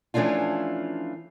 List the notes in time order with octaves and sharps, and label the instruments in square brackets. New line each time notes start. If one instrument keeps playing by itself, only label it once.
[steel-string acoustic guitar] E3 F3 A3 C#4 D4 F4